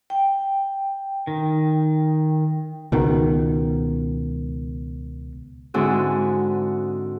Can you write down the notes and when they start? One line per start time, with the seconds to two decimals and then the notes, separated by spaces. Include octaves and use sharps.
0.10 G5
1.27 D#3
2.92 C#2 B2 D#3
5.74 G#2 D3 G#3 C4 E4 F#4